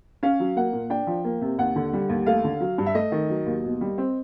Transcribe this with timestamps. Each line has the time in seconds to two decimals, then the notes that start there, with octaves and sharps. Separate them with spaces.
0.23 C#4 F5
0.40 F#3
0.56 A#3 F#5
0.73 A#2
0.90 D4 G5
1.07 F3
1.24 A#3
1.41 C3
1.58 D#2 F#5
1.76 D3
1.93 G3
2.09 D#2
2.26 A3 F5
2.44 D3
2.61 F#3
2.78 G2
2.86 E5
2.95 A3 D#5
3.12 D#3
3.30 F#3
3.46 D#2
3.64 B2
3.81 G3
3.98 C4